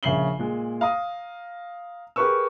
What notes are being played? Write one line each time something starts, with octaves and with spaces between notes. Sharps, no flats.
A#1 C#3 E5 C7 F#7 G7
A#2 G#3
F5 A#5 D#6
G4 G#4 A#4 B4 C#6 E6